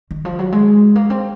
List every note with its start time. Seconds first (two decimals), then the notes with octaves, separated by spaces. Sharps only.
0.11 D#3
0.25 F3
0.39 F#3
0.52 G#3
0.96 A#3
1.10 C4